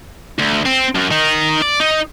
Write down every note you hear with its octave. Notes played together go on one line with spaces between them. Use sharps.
D2
C4
F#2
D#3 D#4
D5
D#4